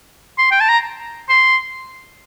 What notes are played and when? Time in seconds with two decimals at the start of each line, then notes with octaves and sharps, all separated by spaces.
0.38 C6
0.51 G5
0.61 A5
0.69 A#5
1.29 C6